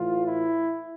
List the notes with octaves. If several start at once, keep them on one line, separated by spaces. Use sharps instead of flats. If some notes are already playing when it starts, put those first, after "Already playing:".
Already playing: A2 E3 F4
E4